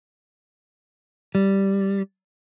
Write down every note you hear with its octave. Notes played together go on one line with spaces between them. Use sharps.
G3